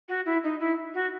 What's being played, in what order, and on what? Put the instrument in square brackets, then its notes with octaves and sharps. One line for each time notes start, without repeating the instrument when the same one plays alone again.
[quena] F#4
E4
D#4
E4
F#4